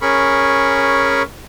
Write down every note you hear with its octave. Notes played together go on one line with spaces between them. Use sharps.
C#4 G#4 A#4 B5 C#6